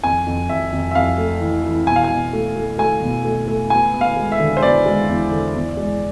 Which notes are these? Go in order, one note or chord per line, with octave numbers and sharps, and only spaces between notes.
F2 G#5
F2
F2 E5
F2
E5
F2 F5
A3
E3
E3
B2 G#5
F5
G#5
B2
A3
A3
A3 G#5
B2
A3
A3
B3 G#5
B3
F5
G#3
E5
D3
C5
B3 D5
G#3
E2
D3
E2
G#3